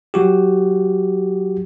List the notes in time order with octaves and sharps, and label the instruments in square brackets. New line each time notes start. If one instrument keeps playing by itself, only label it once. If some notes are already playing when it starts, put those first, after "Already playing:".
[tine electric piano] F#3 F#4 G4